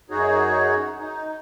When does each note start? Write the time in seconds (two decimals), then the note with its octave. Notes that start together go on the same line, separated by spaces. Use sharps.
0.10 F#2 D#4 F#4 G#4 C#5
0.99 D#4